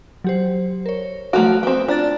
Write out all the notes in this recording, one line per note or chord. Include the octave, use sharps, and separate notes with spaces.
F#3 G4 C5
A#4 C#5
F3 F#3 A3 F#4 F5 D7
B3 C4
D4 F4 A#5 A6